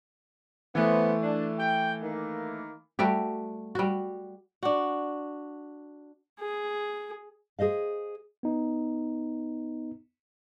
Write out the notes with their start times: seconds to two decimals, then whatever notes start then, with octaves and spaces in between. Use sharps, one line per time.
0.75 E3 A3 B3 C5
1.23 D4
1.58 G5
2.02 D#3 A#3
2.99 G3 A3 F#4 G4
3.75 G3 F#4
4.63 D4 F#4
6.40 G#4
7.59 G#4 C5 D#5 F5
8.43 B3 D#4